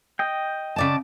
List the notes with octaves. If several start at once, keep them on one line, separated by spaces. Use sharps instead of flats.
D#5 G5
C#3 D5 A5